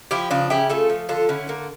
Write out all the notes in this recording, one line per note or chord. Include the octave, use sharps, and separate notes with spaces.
F3 E4 G4
C#3 D4 F4
C#3 E4 G4
A3 F4 A4
F3
D3 F4 A4
D3 C#4 E4
A3 A#3